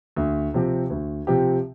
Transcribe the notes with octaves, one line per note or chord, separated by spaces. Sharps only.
D2
C3 F3 C4 G4
D2
C3 F3 C4 G4